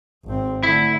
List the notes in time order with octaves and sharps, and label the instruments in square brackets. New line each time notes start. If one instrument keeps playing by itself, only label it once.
[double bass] G#1 C4
[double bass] D3 A3 [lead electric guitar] E4